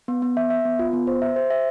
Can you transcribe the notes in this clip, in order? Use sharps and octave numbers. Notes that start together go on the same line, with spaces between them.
B3
B3
E5
E5
B3
F4
B3
C5
E5
C5
E5